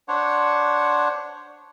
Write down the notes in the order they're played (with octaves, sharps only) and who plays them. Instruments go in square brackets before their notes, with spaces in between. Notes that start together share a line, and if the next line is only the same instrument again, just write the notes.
[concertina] D4 C5 C#5 F#5